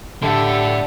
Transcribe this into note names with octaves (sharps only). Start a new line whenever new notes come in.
D3 A3 E4 G4 A4 F#5